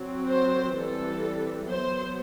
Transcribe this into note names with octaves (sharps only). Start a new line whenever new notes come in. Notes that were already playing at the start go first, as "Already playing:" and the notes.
Already playing: F#3 C4
C5
E3 G3 C4 A4
F#3 B3 C5